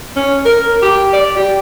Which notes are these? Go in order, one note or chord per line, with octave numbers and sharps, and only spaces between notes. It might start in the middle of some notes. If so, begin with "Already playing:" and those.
C#4
A#4
G4
D5
G4